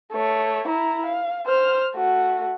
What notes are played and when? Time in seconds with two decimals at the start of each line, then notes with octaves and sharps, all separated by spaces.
0.13 A3 C#5
0.68 E4 A#5
1.06 F5
1.46 C5 F6
1.95 A3 F#4